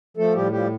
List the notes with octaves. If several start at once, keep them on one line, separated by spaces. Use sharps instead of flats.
F3 A3 A4
A2 G3 G4
F3 G3 G4